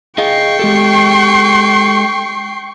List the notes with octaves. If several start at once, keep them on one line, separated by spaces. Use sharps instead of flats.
G#4 D#5 F5 G5 C#6 C7
G#3 G4 A4